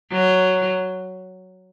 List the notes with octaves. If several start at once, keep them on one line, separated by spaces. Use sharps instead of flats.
F#3